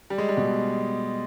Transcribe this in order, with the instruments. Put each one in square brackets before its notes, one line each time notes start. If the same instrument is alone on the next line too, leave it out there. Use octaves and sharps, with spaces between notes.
[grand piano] G3
G#3
G3
B2